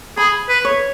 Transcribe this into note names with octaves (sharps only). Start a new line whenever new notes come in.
G#4 B5
B4
C#5